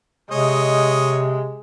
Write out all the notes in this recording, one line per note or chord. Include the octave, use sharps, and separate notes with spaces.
C3 G#3 C#5 D#5